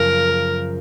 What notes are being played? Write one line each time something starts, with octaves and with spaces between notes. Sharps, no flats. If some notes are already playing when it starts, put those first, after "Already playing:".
Already playing: F#2 C#3 F3 A#4